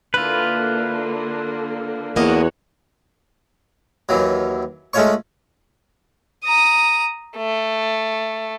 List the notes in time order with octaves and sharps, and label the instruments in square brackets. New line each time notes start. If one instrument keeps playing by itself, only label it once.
[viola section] D3 A#3 [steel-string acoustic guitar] E4 [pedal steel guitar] F4 B4
[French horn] E2 [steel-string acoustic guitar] A#3 B3 D#5 [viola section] F#4 C#5
[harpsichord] D#2 E3 F#3
G#3 A3 C#4 F4 C#5 C#6
[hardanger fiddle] A#5 D#6
A3